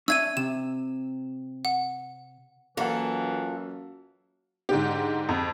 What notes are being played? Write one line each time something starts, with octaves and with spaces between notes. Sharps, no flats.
C#4 D4 E5 E6 G#6 D#7
C3 E7
F#5
F#2 E3 A#3 F4 A4 F#5
G#2 D3 G4
F2